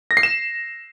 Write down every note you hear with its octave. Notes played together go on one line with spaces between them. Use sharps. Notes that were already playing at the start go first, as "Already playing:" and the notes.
A#6
C7
E7